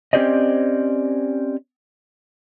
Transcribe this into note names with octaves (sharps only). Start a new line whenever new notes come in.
C4 C#4 G4 C5 D5 D#5